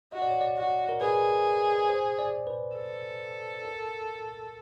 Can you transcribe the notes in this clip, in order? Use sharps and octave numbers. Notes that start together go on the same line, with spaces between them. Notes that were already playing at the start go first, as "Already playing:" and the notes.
F#4 D#5
D5
C#5
D5
F#4
A#4
G#4 B4
C5
D5
B4
A4
A#4